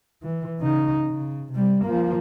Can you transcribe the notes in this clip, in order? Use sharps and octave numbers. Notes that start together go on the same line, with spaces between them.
E3
C#3 D#4
C#3
C3 G3
F3 A#3